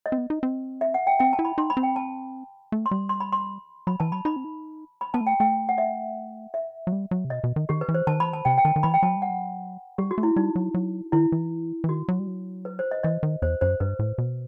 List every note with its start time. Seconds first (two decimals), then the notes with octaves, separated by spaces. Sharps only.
0.06 D#5
0.12 C4
0.18 B3
0.30 D#4
0.43 C4
0.81 E5
0.94 F#5
1.07 G5
1.19 C4 G5
1.33 A5
1.39 E4
1.45 B5
1.58 D#4 C6
1.70 B5
1.77 C4
1.83 G5
1.96 A5
2.72 A3
2.86 C6
2.91 G3
3.09 C6
3.20 B5
3.33 C6
3.87 F#3 B5
4.00 E3 A5
4.12 F#3 B5
4.25 D#4 B5
4.36 C4
4.45 D#4
5.01 B5
5.14 B3 A5
5.21 A3
5.27 G5
5.40 A3 G5
5.69 F#5
5.78 E5
6.54 E5
6.87 F#3
6.92 G3
7.11 F#3
7.25 C3
7.30 B2 D#5
7.44 B2
7.56 D#3
7.69 D#3 G4
7.81 B4
7.89 E3
7.94 C5
8.07 D#3 A5
8.20 E3 B5
8.33 D#3 A5
8.45 C3 G5
8.58 G5
8.65 D#3 A5
8.76 D#3
8.83 E3 B5
8.94 G5
9.03 F#3 A5
9.16 G3
9.22 F#5
9.30 F#3
9.98 G3 G4
10.11 F#4
10.18 A3
10.23 E4
10.36 G3 D#4
10.56 F#3
10.74 F#3
11.12 D#3 E4
11.32 E3
11.84 E3
11.89 D#3 F#4
12.08 F#3
12.19 G3
12.27 F#3
12.65 B4
12.79 C5
12.91 D#5
13.03 E3 D#5
13.23 D#3
13.42 E2 C5
13.61 F#2 C5
13.80 G2 B4
13.99 A2
14.18 B2